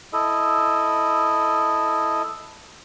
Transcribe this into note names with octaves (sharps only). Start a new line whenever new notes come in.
E4 A4 D#5